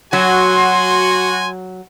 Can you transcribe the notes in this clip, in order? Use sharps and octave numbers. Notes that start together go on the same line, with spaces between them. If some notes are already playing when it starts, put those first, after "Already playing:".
F#3 F#4 G#5 C6